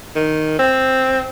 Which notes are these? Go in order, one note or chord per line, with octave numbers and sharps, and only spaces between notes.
D#3
C4